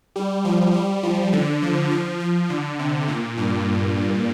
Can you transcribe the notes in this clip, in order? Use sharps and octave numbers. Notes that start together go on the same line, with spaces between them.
G3
F3
G3
F3
D3
F3
F3
F3
D3
C3
A#2
G2